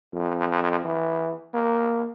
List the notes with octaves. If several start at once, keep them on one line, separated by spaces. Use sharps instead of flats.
F2
E3
A#3